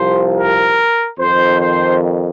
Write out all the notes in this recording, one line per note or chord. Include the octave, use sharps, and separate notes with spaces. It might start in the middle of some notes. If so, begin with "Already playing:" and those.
Already playing: C2 C3 F3 C5
A#4
F2 D#3 C5
C5